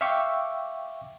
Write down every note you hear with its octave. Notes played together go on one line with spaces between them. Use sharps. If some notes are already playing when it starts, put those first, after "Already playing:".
E5 F5 G5 C#6 D6 E6